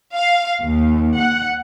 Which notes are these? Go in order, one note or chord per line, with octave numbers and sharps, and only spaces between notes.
F5
D#2
F#5